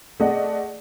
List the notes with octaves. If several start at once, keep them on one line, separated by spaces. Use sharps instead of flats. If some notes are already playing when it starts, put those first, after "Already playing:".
A3 G#4 D5 D#5 F#5